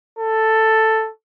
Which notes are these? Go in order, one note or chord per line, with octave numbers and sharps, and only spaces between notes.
A4